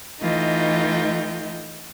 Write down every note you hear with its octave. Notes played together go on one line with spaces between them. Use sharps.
E3 A3 D#4 F4 D#5 G5